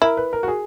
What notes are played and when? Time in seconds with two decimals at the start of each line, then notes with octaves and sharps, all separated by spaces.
0.02 E4 A#4
0.17 B4
0.33 A#4
0.43 F#4
0.48 G#4